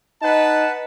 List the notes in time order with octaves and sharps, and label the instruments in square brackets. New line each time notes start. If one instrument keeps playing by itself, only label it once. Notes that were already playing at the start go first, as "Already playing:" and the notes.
[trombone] D#4 [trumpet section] B4 F#5 A5